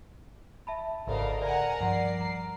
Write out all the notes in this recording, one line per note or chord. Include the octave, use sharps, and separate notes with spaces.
E5 A5 B5
G#1 D2 G#2 C#3 A4 A#4 F5
A#4 D5 F#5 G#5 A#5
G2 F3 D5 F#5 C7
A#5